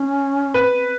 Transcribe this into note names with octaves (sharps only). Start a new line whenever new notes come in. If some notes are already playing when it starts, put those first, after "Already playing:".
Already playing: C#4
C4 B4
C4